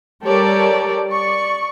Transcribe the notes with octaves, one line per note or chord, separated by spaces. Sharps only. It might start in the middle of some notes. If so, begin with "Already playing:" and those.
G3 G4 A4 A#4 C#5 D5
D5 C#6